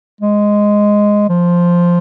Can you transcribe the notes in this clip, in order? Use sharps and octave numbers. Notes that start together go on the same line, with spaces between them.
G#3
F3